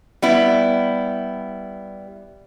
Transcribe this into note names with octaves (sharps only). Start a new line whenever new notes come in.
G3 B3 E4